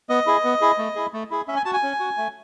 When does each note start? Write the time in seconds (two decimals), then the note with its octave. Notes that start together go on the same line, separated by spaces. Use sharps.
0.09 B3 D#5
0.27 E4 G#4
0.44 B3
0.61 E4 G#4
0.78 A3
0.96 E4 G#4
1.13 A3
1.31 E4 G#4
1.48 C#4 E5
1.56 G#5
1.65 F#4 A5
1.73 G#5
1.83 C#4
2.00 F#4
2.17 A3